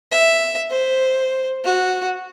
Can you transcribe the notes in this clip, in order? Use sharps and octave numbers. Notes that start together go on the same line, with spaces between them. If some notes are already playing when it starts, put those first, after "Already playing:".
E5
C5
F#4